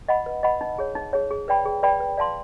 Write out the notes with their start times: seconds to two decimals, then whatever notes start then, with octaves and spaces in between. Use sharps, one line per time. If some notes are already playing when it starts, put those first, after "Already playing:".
0.08 D#5 F#5 B5
0.26 B4
0.43 D#5 F#5 B5
0.61 D#4
0.78 G#4 C#5
0.95 D#4
1.13 G#4 C#5
1.31 G#4
1.48 B4 D5 G5 B5
1.65 G#4
1.83 B4 D5 G5 B5
2.00 B4
2.18 D5 F5 A5 C6